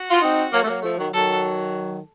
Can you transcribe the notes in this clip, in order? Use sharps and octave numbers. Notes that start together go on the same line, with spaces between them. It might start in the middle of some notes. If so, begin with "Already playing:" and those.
Already playing: F#4
F4
C4 D#4
F#3 A#3
A3
F#3 A#3
F3 A3
D#3 F#3
D#3 F#3 A4